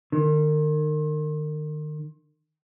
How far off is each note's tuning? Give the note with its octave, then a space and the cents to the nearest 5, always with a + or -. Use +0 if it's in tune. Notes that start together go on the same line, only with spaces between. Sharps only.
D#3 -35